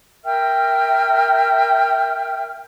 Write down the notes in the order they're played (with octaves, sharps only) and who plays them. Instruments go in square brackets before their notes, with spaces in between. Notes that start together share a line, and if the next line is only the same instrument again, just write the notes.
[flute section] A#4 E5 G5 F6